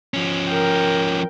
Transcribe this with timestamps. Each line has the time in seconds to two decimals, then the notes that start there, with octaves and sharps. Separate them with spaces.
0.14 F3 C#4
0.48 A#4 G5